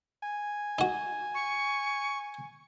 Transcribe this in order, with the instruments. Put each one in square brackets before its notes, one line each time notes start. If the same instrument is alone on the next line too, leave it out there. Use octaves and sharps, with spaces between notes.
[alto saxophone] G#5
[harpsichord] D#4 F#4
[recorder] C#6